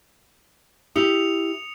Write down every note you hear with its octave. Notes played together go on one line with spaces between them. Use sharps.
E4 G4 D#6 C#7 F7